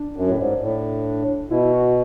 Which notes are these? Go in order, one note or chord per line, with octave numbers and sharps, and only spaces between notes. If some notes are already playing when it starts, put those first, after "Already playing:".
Already playing: D4
F#2
A2
G#2
A2
B2 E4
F#4